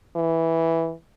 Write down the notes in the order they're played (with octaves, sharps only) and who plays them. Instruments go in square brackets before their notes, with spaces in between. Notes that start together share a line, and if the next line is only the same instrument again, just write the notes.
[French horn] E3